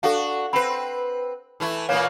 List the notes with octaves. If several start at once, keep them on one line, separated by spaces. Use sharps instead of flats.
D4 F#4 A4 F5
C4 B4 B5
E3 A3 E4
A#2 E3 A#3 C#5 F5